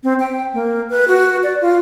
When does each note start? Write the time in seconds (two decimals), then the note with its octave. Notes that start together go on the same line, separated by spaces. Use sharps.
0.04 C4
0.20 G5
0.54 A#3
0.90 B4
1.08 F#4
1.43 D5
1.61 F4